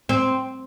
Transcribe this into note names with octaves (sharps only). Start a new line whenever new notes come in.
C4